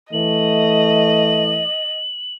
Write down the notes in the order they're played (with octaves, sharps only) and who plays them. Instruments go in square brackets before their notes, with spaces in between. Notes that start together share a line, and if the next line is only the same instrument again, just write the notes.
[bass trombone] E3 [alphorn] A3 [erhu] D#5 [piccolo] F#7